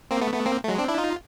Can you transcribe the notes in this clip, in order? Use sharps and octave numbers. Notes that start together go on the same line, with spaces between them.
A#3 C4
A3 B3
A3 B3
A#3 C4
A3
F#3 G#3
C4 D4
D4 E4
D#4 F4